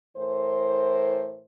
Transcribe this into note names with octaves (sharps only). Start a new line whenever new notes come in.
A2 E3 A#4 C5